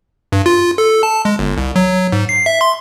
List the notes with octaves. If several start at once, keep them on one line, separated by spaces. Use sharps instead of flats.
G2
F4
A4
A5
G#3
G1
C2
F#3
G#2
C7
E5
C6